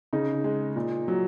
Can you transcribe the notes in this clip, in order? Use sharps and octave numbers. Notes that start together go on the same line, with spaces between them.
C#3 D#4
G#3
A#2
F#3